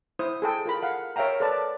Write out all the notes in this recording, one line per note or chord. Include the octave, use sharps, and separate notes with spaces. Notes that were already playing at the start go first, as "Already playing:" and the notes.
E4 C5 D#6
G#4 A4 G5
F4 A#4 B5
F5 F#5 B5
A#4 C#5 E5 F5 G5 A#5
A4 B4 D5 A5